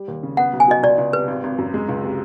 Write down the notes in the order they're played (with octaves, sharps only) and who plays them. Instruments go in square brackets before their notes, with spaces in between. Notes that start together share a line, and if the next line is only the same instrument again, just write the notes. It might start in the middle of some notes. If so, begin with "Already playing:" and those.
Already playing: [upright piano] G3
D#2
C#3
[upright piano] B3 [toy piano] F#5
[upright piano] B1
[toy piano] G#5
[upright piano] B2 [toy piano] D#5
[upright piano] C#2 [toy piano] D5
[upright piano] C#2
[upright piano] C3 [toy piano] B4
[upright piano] G#1
G#1
F#2
G#3
C#2
C3